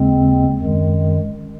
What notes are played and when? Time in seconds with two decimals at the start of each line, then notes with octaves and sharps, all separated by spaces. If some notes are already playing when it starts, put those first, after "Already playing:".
Already playing: D#2 C#3 G#3 C4
0.60 F#2 D#3 G#3